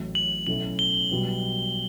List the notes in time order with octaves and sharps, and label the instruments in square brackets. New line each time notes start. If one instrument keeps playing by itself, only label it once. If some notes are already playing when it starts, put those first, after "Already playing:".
Already playing: [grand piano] A1 A2 F#3
[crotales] F#7
[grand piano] B1 B2 A3 C#4 E4 [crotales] F#7
[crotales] G7
[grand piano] B1 B2 G3 B3 F#4